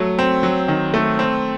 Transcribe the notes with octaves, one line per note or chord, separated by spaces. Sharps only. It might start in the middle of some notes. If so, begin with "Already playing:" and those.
Already playing: F#3 A3
C4
F#3
D#3
A3
C4